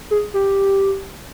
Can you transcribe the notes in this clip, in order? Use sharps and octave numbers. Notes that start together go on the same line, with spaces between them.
G#4
G4